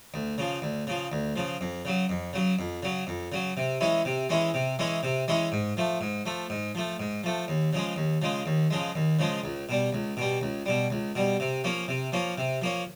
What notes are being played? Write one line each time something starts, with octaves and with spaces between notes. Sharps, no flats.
D2
C#3 F3
D2
C#3 F3
D2
C#3 F3
F2
C#3 F#3
F2
C#3 F#3
F2
C#3 F#3
F2
C#3 F#3
C3
E3 G#3 C#4 E4
C3
E3 G#3 C#4 E4
C3
E3 G#3 C#4 E4
C3
E3 G#3 C#4 E4
G#2
F3 A3
G#2
F3 A3
G#2
F3 A3
G#2
F3 A3
D#2
C#3 F3 G#3
D#2
C#3 F3 G#3
D#2
C#3 F3 G#3
D#2
C#3 F3 G#3
C#2
B2 G3
C#2
B2 G3
C#2
B2 G3
C#2
B2 G3
C3
F3 A#3 C#4
C3
F3 A#3 C#4
C3
F3 A#3 C#4